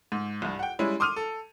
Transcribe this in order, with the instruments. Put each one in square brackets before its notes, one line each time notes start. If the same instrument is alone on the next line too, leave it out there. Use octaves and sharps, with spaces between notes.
[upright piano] G#2
C2 G2
F#5 G5
G3 G#3 C#4 E4
C6 D6 D#6 F6 D#7 F7
A4